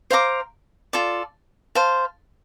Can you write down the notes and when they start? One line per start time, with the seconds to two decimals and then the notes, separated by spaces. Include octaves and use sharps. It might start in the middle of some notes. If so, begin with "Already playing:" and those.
0.10 C5 F5 A#5 D6
0.93 F4 A4 D5
1.75 C5 F5 A5